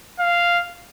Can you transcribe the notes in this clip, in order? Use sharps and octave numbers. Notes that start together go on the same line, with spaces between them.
F5